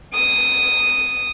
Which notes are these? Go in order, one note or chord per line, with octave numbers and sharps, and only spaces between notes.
D#6